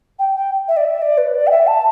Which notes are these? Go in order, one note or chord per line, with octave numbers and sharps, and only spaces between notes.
G5
G5
E5
D5
E5
D5
B4
D5
G5
E5
A5